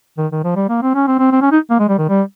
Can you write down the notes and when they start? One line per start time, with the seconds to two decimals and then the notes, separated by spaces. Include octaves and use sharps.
0.18 D#3
0.32 D#3
0.44 F3
0.56 G3
0.69 A#3
0.82 C4
0.95 C#4
1.07 C4
1.19 C4
1.32 C4
1.42 C#4
1.52 D#4
1.70 A#3
1.79 G#3
1.89 G3
1.98 D#3
2.09 G3